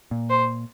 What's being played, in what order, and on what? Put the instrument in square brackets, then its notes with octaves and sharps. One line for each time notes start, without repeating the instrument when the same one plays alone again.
[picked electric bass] A#2
[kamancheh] C5